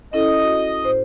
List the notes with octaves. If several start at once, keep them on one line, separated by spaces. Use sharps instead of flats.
C#4 E4 A4 D#5
F#4
A2 C5